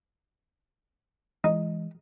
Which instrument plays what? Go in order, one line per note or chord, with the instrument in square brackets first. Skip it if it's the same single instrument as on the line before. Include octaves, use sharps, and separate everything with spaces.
[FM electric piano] E3 G#3 [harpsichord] D#4